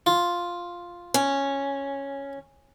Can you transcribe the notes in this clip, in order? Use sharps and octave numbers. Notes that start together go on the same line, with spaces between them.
F4
C#4